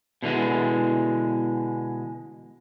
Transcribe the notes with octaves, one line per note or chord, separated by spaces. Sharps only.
B2 D3 E3 G#3